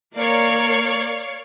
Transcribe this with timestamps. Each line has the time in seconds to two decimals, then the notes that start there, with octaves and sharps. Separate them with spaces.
0.14 A#3 A#4 C#5 D5 F5